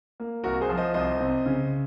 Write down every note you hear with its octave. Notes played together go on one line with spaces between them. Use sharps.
A#3
C2 F#4 A#4
G#4 C5
F3
C5 D#5
C2 C5 D#5
C3
C#3